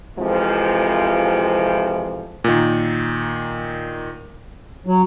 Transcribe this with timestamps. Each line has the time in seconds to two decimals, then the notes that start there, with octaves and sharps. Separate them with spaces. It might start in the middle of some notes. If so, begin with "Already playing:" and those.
0.18 F2 C3 E3 F3 G#3
2.44 A#2 D#3
4.87 F#3